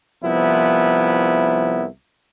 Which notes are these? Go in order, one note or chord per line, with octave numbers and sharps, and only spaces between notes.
C2 F3 B3 E4